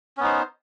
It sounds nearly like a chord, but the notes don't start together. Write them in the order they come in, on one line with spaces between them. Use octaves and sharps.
C#4 B3 D#4 C5